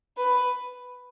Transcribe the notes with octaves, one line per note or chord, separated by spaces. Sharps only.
B4